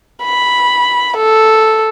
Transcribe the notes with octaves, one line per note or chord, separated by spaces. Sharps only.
B5
A4